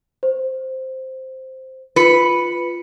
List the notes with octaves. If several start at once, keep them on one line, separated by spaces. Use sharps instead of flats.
C5
F4 B4 C#7